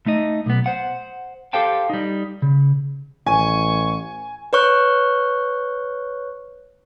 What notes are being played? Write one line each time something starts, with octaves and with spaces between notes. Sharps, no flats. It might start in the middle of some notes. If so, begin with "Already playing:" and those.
A3 D#4 D#5
B1 B3
C5 F#5
G4 A4 C5 F5 G5 A5
G3 D#4
C#3
A1 G#5 C#6
B4 C#5 C#6 F#6